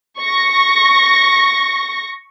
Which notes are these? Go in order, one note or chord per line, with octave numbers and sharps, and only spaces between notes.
C#6 A#6